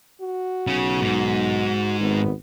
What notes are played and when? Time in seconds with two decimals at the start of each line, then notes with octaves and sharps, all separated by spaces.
0.21 F#4
0.67 B1 C#3 C#4
1.01 G#2
2.00 G#1 B3